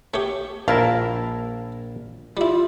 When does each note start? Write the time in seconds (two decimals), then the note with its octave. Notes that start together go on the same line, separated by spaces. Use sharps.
0.14 A3 G4 C#5
0.68 A#1 E4 A#4 F5 A5
2.37 G3 E4 F4